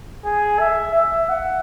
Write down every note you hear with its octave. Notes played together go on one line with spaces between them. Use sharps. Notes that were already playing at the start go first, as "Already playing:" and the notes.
G#4
E5
E5
F#5